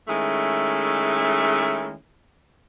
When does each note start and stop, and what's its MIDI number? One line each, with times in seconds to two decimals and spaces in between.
0.08 1.93 51
0.08 1.93 56
0.08 1.93 57
0.08 1.93 61
0.08 1.93 64